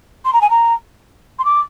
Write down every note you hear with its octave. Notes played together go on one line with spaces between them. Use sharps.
C6
A#5
G#5
A#5
C6
D6